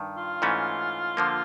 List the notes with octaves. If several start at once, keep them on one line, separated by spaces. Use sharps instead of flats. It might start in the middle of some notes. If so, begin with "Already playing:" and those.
Already playing: G2 D#3
F4
G#2 E3 A3 C#4
D3 F3 A#3